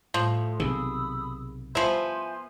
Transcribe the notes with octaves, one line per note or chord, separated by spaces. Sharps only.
A2 F3
B1 C3 D#3 G#4 B5 D#6 E6
F3 B3 E4 C5 G#5 C6 G6